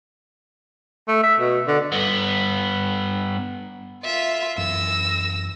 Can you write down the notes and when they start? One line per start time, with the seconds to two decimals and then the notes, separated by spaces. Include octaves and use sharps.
1.08 A3
1.23 E5
1.40 B2
1.67 D3
1.92 G2 B3
4.04 F4 E5
4.58 F#2 E3 E6 A#6